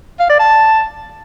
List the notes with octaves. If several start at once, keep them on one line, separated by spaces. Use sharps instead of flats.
F5
D5
A5